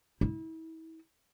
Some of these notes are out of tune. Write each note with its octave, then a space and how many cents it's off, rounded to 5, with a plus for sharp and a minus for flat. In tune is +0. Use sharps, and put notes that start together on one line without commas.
E4 -35